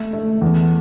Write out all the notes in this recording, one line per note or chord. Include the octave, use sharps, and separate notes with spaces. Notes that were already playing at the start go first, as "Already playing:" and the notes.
Already playing: A3
A3
E2